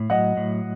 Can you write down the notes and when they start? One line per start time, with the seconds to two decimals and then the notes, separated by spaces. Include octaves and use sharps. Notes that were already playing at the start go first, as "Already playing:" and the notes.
Already playing: A2
0.10 F#3 D#5 F#5
0.37 A2